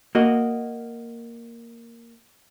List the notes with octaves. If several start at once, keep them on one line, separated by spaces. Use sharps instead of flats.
A#3 F#4 D#5